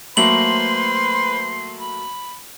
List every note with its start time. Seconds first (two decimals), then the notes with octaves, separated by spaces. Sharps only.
0.17 F#3 A3 A#3 B4 C5 B5 C6 F#7
1.80 B5